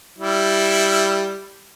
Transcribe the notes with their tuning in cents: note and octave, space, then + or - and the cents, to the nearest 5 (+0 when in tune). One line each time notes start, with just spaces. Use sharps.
G3 +0 E4 +0